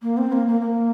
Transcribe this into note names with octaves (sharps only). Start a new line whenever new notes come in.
A#3
C4
A#3
A#3
A#3